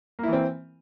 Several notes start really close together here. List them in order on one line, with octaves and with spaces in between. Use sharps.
A#3 E4 E3 C4